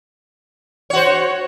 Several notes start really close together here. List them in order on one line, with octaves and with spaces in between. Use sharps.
C#5 F#4 C5